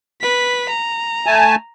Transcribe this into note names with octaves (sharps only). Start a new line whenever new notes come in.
B4 B6
A#5
A3 G#5 A5